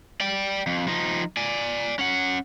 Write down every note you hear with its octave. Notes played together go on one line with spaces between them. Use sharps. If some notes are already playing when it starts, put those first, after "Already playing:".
D5 G5
F2
F3 D#4
D5 G#5
C#4 F#5